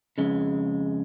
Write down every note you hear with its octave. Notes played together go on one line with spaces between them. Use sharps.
F2 C#3 G#3